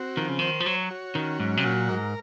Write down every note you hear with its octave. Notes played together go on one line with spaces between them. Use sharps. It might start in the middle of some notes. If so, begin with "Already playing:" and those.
Already playing: C4 F#4
D#3 F3
C#3
D#3 C5
F3
F#3 C#5
F#4
D#3 C#4
G#2 F#3
C3
A#2 F#4
G#2 A#4